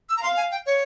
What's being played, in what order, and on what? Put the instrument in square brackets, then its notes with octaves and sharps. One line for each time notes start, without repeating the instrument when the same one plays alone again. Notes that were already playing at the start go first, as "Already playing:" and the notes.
[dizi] E6
A#5
[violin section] F5 [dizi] C6
[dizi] G#5
G5
C#5